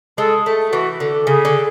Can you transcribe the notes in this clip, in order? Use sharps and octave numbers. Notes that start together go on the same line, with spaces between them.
G#3 A4
A3
E3 F#4
D3
C#3 G#4
D3